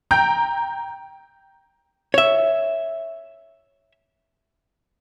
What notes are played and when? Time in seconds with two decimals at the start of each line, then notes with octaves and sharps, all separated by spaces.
0.11 G5 A#5 G6
2.14 C#5 E5